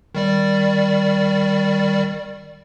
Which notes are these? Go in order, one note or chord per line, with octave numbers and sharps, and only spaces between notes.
D#3 G3 D5